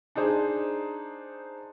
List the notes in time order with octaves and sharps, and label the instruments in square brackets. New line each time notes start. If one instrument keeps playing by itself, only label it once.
[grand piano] D4 D#4 G#4 C5